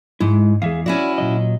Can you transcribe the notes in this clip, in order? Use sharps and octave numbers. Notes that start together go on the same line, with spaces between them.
G#2 G#3 E4
E2 G#4 E5 F5
C#4 E4 F#4 D5
A#2 F#3 D#5